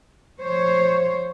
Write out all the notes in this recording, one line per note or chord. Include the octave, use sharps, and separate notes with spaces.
F3 C5 C#5